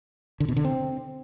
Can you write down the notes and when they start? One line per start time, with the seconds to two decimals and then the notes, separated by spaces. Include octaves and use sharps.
0.40 D3
0.48 B2
0.56 D3
0.64 C4